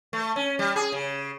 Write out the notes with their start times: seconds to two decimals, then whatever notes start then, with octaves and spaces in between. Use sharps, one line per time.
0.13 A3
0.36 C#4
0.59 G3
0.76 G#4
0.92 C#3